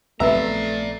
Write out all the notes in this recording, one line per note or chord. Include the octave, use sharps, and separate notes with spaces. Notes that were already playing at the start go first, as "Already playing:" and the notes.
A#1 F#3 A3 C4 B4 D5 E5 A#5